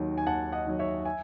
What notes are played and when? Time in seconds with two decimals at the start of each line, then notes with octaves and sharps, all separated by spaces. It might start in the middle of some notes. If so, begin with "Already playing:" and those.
Already playing: D#2 D#3 F#3
0.18 G#5
0.26 D#2 F#5 A5
0.52 D#5 F#5
0.67 D#3 F#3
0.79 C#5 E5
1.05 E5 G#5